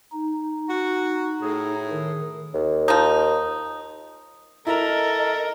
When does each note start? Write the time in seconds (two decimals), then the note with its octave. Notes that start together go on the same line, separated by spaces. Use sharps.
0.12 D#4
0.69 F#4
1.42 A2 G#4
1.90 D#3
2.54 D#2
2.88 F3 D#4
4.67 E4 A4 A#4 D#5 A#5